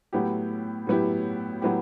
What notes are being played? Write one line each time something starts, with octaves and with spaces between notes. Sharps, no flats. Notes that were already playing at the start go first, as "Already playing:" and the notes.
A2 F#3 B3 E4 G4
A2 F#3 B3 E4 G4
A2 F#3 B3 E4 G4